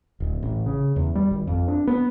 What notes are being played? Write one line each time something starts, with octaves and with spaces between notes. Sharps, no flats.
D1
A1
C#3
E2
G3
G#1
F2
D4
B3